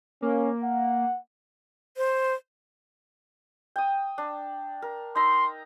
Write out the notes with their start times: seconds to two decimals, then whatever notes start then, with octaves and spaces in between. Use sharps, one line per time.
0.22 A#3 C#4
0.63 F#5
1.97 C5
3.76 G5 D#6
4.18 D4
4.82 A#4
5.15 D#4 A#5 C6 E6